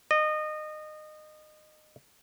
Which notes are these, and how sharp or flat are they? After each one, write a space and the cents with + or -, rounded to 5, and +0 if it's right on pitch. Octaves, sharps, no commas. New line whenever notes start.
D#5 -25